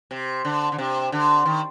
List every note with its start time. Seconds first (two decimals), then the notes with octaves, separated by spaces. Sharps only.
0.11 C3
0.45 D3
0.72 D3
0.78 C3
1.12 D3
1.45 D#3